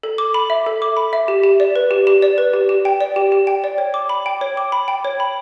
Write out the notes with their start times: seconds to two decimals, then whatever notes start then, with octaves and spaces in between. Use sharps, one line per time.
0.03 A4
0.18 D6
0.34 B5
0.50 E5
0.66 A4
0.82 D6
0.97 B5
1.13 E5
1.28 G4
1.44 G4
1.60 D5
1.76 B4
1.91 G4
2.07 G4
2.22 D5
2.38 B4
2.53 G4
2.69 G4
2.85 G5
3.01 D5
3.16 G4
3.32 G4
3.47 G5
3.64 D5
3.78 C#5
3.94 D6
4.09 B5
4.26 G5
4.41 C#5
4.57 D6
4.72 B5
4.88 G5
5.05 C#5
5.20 B5